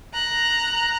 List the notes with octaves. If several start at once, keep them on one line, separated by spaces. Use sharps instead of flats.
A#5 F#6